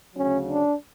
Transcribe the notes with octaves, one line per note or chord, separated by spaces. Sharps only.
D2 C#3 F#3 C#4
D4